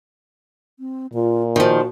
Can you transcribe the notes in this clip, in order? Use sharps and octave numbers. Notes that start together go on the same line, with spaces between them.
C4
A#2 F4
D#3 F3 F#4